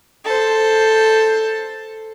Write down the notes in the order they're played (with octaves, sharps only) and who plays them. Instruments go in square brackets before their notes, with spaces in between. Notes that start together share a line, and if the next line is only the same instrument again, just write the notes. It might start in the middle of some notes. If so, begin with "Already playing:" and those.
[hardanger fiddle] A4 C5